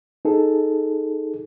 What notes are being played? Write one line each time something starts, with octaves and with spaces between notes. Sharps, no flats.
D#4 G#4 A4